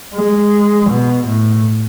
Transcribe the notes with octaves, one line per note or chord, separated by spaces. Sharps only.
G#3
B2
A2